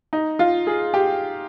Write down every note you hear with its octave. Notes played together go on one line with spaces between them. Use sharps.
D#4
F4
G#4
G4